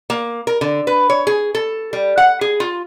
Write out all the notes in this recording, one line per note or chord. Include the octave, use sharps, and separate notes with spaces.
A#3
A#4
D3
B4
C#5
G#4
A4
G3
F#5
G#4
F4